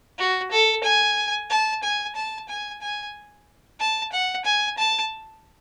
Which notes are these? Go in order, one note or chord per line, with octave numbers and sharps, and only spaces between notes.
F#4
A4
G#5
A5
G#5
A5
G#5
G#5
A5
F#5
G#5
A5